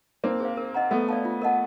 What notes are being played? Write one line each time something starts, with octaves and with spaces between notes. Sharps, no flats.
A#3 C4 D#4
G#4 C5 F5
A#4
D#5 F#5 A#5
A3 B3 A4
D5 F5 A5
F4
A#4 D#5 F#5 A5